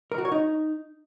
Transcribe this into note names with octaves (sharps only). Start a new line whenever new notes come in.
A#4
F#4
C#5
D#4